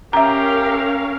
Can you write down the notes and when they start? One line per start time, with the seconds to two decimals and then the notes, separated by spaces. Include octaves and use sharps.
0.13 C#4 G4 A#4 E5 F5 A#5